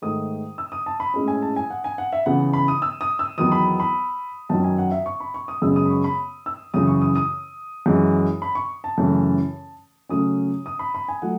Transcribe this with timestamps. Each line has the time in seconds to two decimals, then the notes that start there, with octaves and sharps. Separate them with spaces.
0.02 G#2 D#3 A3 D#6
0.58 E6
0.72 D#6
0.86 A5
1.00 B5
1.14 A2 G#3 C#4
1.28 G#5
1.42 A5
1.56 G#5
1.70 F#5
1.84 G#5
1.98 F#5
2.13 E5
2.26 C#3 E3 B3 F#5
2.53 B5
2.68 D#6
2.82 E6
3.01 D#6
3.19 E6
3.38 E2 D#3 F#3 B3 D#6
3.52 B5
3.80 B5
4.49 F#2 D#3 F#3 B3 A5
4.64 G#5
4.78 F#5
4.92 E5
5.06 C#6
5.20 B5
5.34 C#6
5.48 D#6
5.62 F#2 C#3 G#3 B3 E6
5.76 D#6
5.86 B5
5.90 C#6
6.04 B5
6.46 E6
6.74 F#2 C#3 E3 D#6
6.87 C#6
7.02 D#6
7.16 D#6
7.86 F#2 E3 G#3
8.42 B5
8.55 C#6
8.84 A5
8.98 F#2 C#3 E3 A3 C#4
10.09 C#3 F#3 A3 C#4 D#6
10.66 D#6
10.79 B5
10.95 B5
11.08 G#5
11.22 F#3 A3 F#5